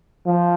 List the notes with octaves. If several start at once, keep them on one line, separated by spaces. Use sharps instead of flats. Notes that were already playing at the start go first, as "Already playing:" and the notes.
F3